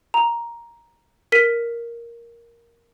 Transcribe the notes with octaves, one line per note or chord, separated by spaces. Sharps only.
A#5
A#4 B6 D#7